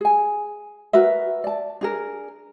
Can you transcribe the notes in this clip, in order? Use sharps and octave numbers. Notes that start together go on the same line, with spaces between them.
G#4 G#5
F#4 A#4 B4 E5
D5 A5
D4 G#4 A#4